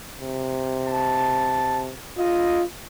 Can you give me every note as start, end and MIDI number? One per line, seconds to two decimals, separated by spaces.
0.21 1.93 48
0.86 1.80 81
2.19 2.61 34
2.19 2.63 65
2.19 2.61 75